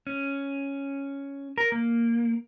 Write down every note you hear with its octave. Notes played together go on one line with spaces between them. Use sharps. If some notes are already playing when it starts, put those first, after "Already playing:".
C#4
A#4
A#3